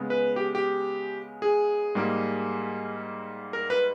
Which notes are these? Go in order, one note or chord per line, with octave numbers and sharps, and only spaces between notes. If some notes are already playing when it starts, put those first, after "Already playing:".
Already playing: C#3 G#3 B3
B4
G4
G4
G#4
G#2 G3 A#3
A#4
B4